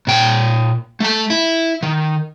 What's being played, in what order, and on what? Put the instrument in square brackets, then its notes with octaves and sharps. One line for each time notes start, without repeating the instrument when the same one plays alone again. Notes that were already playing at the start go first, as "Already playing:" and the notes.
[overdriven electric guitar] A#2 G5
A3 A5
E4
D#3